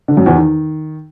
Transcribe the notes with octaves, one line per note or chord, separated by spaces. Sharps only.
D3
F#2
E2
D#3